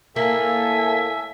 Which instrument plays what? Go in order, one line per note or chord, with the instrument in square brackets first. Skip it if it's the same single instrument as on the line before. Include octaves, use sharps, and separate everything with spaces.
[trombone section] A2 A4 [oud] A#3 [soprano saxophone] E5 [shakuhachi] G#5